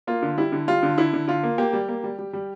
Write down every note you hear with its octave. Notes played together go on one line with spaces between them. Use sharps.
A#3 F4
D3
G3 E4
D3
G3 F4
D3
D3 E4
D3
D3 F4
A#3
A#3 G4
G3
A#3
G3
G3
G3